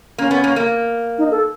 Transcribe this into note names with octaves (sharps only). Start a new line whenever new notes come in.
A#3 C#4
B3
A#3
A#3
D#4
A4